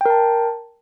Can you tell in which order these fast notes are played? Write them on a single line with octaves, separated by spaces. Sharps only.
G5 A#4 A5